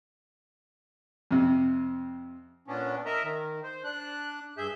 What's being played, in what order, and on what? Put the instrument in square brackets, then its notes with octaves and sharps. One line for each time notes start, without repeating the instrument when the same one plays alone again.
[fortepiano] F2 C3
[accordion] A#2 B3 C#4 D4
A#4 D#5 E5 A#5
D#3
C5
D4 F#6
G2 G#4 E5 G6